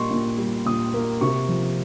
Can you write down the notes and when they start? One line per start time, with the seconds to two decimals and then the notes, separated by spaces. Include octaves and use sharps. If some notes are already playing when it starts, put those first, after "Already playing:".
Already playing: A#2 G3 A#3 D#5 C6 C#6
0.11 A#2
0.38 G3
0.66 A#2 D#6
0.94 A#3
1.21 C3 C#6
1.49 F3